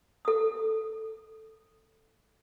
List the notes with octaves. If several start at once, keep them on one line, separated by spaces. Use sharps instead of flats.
A4 D#6